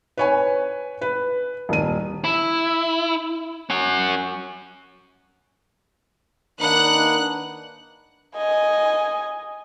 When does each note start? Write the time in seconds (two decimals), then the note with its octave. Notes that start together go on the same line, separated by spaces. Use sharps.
0.17 B4 C#5 G#5
1.01 B4
1.69 D#1 D#7
2.24 E4
3.70 C#4 F#4
6.61 D#3 A#3 D4 D#4 B4 F#5 F#6
8.36 D#5 G#5